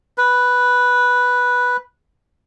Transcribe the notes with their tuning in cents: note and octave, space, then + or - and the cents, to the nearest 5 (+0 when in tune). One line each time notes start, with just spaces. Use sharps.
B4 -5